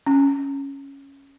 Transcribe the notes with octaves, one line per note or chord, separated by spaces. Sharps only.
C#4